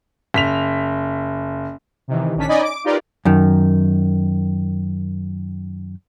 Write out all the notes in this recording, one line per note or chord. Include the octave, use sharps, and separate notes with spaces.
F#1 B6 F7
C3 D#3 E3
A#1 D#3 C#4 D4 B6
C#4 D#4 D5 D#5 G#5 B5
D6 D7
D#4 F4 G4 A#4 B4 D5
F#2 D#3